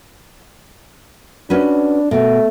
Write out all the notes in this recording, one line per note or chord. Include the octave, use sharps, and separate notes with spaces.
C#4 D4 F#4 B4
B2 A3